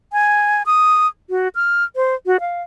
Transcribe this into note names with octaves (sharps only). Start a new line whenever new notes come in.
G#5
D#6
F#4
F6
C5
F#4
F5